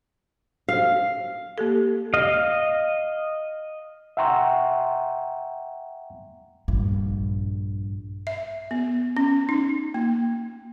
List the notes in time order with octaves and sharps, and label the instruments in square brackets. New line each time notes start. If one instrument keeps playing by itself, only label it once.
[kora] F5
[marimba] A#3 G4 A4
[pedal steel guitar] D#5 F5
[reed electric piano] E5 F#5 G5 A#5 C6 C#6
[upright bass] A#1 G2
[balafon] E5
B3
C#4
D#4
A#3